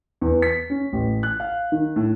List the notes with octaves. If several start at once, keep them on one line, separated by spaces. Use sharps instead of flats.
E2
B6
C#4
A1
F#6
F5
D#3
A2